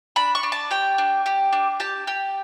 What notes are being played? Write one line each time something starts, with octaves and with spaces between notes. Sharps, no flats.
D4 B5
C#6
D4
A5
G4 G5
D4
G4
D4
G4 A5
G4